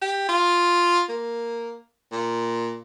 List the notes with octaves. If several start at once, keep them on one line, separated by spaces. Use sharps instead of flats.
G4
F4
A#3
A#2